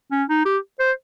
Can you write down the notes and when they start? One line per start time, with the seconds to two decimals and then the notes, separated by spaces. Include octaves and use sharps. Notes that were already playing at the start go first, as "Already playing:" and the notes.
0.12 C#4
0.29 D#4
0.45 G4
0.80 C5